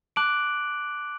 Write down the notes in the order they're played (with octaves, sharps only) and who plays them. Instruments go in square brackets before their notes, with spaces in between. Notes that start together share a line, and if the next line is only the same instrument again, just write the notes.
[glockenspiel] A5 D6 F#6 D7 F#7